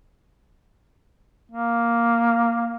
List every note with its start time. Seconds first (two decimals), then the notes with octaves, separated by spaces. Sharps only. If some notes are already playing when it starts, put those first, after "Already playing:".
1.52 A#3